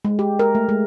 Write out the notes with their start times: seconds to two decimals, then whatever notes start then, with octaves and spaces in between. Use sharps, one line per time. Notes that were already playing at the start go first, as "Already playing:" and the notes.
0.05 G#3
0.19 G4
0.39 A#4
0.55 A3
0.69 G#3